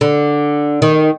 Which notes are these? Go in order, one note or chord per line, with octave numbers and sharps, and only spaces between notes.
D3
D#3